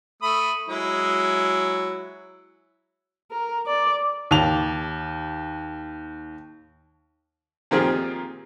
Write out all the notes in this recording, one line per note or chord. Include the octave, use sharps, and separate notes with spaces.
A3 B5 D#6
F#3 G#3 E4
A#4
D5
D#2 A5 F7
A#2 D#3 F3 C4 G4 G#4